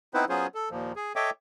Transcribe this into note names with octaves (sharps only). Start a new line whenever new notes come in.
B3 C4 D#4 E4 B4 C5
F#3 B3 C#4 F4 G#4 C5
A4
D#2 A#2 F3
G#4
A4 C#5 D#5 E5 G5 D6